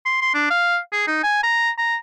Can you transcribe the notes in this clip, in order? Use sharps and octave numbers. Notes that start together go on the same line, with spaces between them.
C6
C6
D4
F5
G#4
D#4
G#5
A#5
A#5